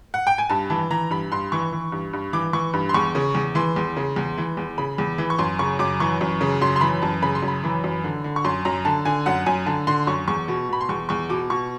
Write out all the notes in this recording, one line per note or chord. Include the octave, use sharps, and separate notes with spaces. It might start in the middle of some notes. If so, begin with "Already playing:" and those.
F#5
G5
G#5
G2 A5
E3 A5
E3 A#5
G2 B5
G2 C6
E3 C#6
E3
G2
G2
E3 D6
E3 C#6
G2
C6
E2 C#6
C#3
E2
E3 C6
E2
C#3
E2
E3
E2
C#3 B5
E2
E3
C#6
F#2 C6
C#3 C#6
F#2 D6
E3 C#6
F#2
C#3
F#2 C6
C6
E3 B5
F#2 A5
C#3 B5
C6
F#2
B5
E3
F#2
D3
D3
C#6
F#2 C6
F#2 A#5
D3 A5
D3 G#5
F#2 F#5
F#2 G#5
D3 A5
D3 C6
F#2 C#6
E2 C#6
B2
B2 B5
C6
E2 C#6
E2 C#6
B2 D6
B2 C#6